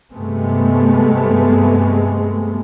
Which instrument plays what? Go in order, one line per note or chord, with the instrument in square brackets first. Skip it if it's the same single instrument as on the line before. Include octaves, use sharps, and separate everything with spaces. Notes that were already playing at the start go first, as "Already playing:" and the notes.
[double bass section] G2 C3 G#3 A3 B3